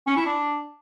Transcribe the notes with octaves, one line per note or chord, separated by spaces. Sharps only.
C#4
E4
D4